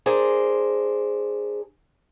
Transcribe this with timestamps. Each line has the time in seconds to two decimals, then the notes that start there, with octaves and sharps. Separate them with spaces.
0.06 D4 G#4 A#4 C5